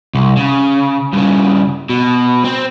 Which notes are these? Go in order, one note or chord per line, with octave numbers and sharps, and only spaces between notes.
C2
C#3
G2 C#3
B2
C4